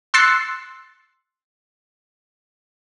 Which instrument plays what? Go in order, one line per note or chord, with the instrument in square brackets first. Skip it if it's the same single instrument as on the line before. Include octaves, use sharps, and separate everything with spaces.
[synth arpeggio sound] C6 E6 F#6 A6 C7 C#7